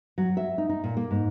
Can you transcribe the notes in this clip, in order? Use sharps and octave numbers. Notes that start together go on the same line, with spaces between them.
F#3
E5
D#4
D#4
A#2
A#3
G#2